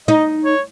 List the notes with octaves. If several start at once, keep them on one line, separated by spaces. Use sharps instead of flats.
D#4 D#5
C#5